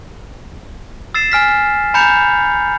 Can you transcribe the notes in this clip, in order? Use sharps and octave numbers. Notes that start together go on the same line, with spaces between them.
E6 A6 C7 E7
G#5 F6 B6
G#5 A#5 B5 G6 C#7 F7